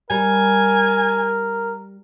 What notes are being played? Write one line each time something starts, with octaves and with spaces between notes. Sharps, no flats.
G3 A#4 G#5